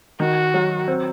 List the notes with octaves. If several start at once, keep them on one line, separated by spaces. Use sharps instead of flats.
D#3 F#4
F#3
C4